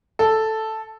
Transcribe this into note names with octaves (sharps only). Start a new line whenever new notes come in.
A4